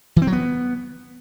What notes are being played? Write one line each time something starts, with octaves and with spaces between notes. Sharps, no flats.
E3
C4
F#3
B3